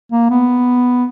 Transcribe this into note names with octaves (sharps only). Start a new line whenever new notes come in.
A#3
B3